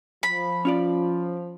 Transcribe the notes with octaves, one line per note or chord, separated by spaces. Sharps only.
F3 B5
C#4 F4 D5